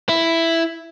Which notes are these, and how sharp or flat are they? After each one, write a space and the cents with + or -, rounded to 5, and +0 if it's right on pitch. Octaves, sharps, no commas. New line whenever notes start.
E4 +5